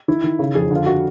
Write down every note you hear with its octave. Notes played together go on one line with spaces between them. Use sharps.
D#3 E4
D#3
C#3
F2 G#4
D3 F4
F#4